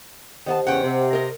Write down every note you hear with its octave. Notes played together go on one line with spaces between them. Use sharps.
D#3 B3 G4 C5 D#5 A5
E2 C#3 C#4 F#5 G5
C3
A#4 D#5